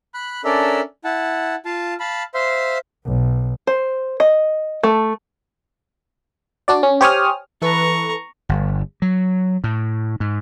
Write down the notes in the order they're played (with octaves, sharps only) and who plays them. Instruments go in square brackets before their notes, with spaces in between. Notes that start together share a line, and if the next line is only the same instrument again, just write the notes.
[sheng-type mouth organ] B5 F#6
C#4 D4 A4 A#4 D5 E5
E4 F#5 A5
F4 F5 A5
F5 A5 B5
C5 E5 F5 C6
[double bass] B1
[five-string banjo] C5
D#5
A3
[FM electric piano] D4 F#4 D5
C#4
G4 C5 C#5 G#5 D#6 F6
[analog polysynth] E3 A4 B4 [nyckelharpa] A#5 C#6
[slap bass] G1
F#3
A2
G#2